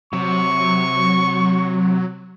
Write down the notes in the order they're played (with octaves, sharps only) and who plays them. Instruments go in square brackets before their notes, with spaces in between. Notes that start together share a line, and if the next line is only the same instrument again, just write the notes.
[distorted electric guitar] C3 [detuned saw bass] F#3 [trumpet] C#6